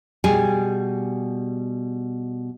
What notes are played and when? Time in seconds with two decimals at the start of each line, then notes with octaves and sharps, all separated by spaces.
0.24 B2 G3 G#4 G#5